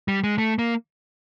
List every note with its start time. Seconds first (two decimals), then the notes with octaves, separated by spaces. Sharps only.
0.08 G3
0.24 G#3
0.38 A3
0.59 A#3